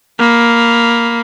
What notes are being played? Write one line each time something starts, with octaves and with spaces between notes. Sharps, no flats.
A#3 B5